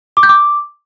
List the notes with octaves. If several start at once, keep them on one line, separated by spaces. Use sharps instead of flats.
D6
G6
D6